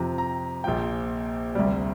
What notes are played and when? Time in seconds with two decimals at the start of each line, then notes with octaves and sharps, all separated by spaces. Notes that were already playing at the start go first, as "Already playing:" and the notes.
Already playing: F2 C3 F3 A#5
0.18 A#5
0.64 A#1 A#2 F3 G5
1.55 D2 C3 G3